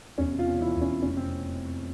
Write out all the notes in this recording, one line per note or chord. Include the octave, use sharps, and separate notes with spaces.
E1 C#4
C3
F4
E2
E3 E4
E1
C#4
C3
F1 C#4
C3 C4